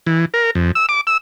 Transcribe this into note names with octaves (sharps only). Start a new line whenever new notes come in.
E3
A#4
F2
E6
D6
E6